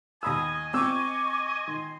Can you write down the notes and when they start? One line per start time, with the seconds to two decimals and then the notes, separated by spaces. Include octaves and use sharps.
0.23 D#2 D#5 G#5 B5 D#6 E6
0.74 C4 C#6 D6 E6
1.67 D#3 C6